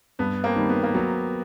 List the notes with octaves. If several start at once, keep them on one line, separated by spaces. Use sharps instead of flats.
G2 B3
A#3 C4
D#3 G3
B3
A#3
F#3 B3